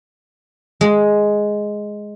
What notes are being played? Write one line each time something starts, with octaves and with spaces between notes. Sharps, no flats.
G#3